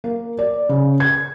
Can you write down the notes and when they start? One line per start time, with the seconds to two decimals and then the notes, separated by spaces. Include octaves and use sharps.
0.04 A#3
0.38 D5
0.69 C#3
1.00 G#6